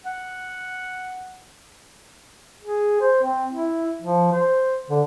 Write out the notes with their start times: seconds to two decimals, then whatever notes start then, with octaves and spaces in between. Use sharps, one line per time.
0.06 F#5
2.62 G#4
3.00 C5
3.23 C4
3.53 E4
4.02 F3
4.31 C5
4.90 D3